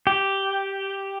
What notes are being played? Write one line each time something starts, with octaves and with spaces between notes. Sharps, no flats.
G4